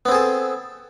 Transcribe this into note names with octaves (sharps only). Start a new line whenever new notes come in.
B3 C4 G#4 A4